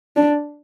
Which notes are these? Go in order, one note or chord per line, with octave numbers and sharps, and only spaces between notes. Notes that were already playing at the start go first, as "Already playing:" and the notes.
D4